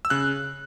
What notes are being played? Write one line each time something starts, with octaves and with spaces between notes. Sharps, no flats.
E6
C#3 F#6